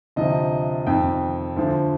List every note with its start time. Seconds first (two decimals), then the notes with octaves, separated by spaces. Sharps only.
0.16 D2 C3 F3 D#5
0.86 F2 D#3 G5
1.57 D2 D3 F3